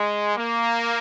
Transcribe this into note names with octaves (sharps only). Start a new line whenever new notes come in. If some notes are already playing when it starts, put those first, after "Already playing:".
Already playing: G#3
A#3